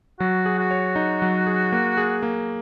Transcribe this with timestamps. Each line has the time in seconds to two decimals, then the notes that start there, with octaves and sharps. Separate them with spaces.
0.20 F#3 F#4
0.46 G#4
0.59 F#4
0.71 C#5
0.96 D#4
1.22 F#3
1.47 G#4
1.72 A#3
1.97 G#4
2.23 A#3